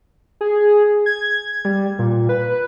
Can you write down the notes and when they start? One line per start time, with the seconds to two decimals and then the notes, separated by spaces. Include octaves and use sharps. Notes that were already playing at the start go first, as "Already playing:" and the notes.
0.41 G#4
1.06 G#6
1.65 G3
1.99 A#2
2.29 B4